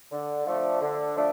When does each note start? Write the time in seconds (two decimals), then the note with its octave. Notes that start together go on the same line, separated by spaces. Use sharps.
0.11 D3
0.46 F3 A3 D4
0.81 D3
1.16 F3 A3 D4